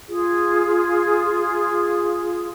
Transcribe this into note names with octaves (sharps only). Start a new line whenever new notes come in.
F4 G#4